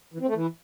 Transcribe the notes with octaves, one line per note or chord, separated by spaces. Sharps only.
E3
C4
A3
E3